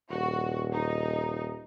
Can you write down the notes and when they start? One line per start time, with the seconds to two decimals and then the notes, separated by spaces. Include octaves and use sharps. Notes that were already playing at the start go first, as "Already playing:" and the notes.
0.11 D#1 F#4
0.73 D#4